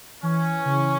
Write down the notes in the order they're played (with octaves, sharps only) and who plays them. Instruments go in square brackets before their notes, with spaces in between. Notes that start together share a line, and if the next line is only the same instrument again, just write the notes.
[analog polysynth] E3 [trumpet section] C#4
[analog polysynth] C#3